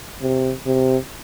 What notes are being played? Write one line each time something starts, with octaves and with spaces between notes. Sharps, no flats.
C3
C3